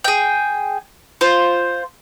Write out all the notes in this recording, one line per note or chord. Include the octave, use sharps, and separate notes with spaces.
G#4 G5
F4 C5